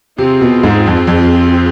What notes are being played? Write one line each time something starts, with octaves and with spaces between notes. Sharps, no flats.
C3 C4 F4 G#4
B2
G#2
F2
F2